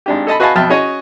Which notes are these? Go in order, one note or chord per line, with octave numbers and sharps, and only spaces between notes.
G#1 D4 G4
A4 D#5 A5 B5
F#4 B4 D#5 F5 G#5 A5
F2 B2 E5 G5 A5 F6
C#4 F#4 G#4 C#5 D#5